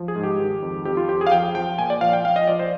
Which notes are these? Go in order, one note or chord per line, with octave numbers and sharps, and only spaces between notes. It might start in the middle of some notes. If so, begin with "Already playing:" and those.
Already playing: F3
G#4
G#2
G4
D#3
F2
F2 G4
F4
F2 G4
G#4
F5
F3 G5
F3 G5
A#2 G#5
D5
F3 F5
G5
F3 F5
D#5
F3 D5
C5